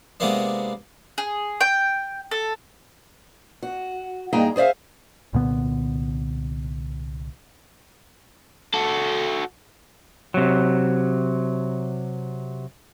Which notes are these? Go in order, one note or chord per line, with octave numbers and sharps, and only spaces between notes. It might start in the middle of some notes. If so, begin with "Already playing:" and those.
C3 G#3 A#3 B3 D4
G#4
G5
A4
F#4
G2 A#3 D#4 G#4 D#5 G5
G#4 C5 D5 E5 F5
C2 A#2 D3 B3
F#4 A4
C3 F#3